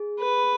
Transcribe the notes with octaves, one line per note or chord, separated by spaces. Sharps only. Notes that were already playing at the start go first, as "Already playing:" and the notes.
Already playing: G#4
B4